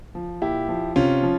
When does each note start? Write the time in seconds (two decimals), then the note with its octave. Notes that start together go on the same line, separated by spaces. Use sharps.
0.15 F3
0.42 A#2 E4 G4
0.69 F3
0.96 C3 C#4 F4
1.22 F3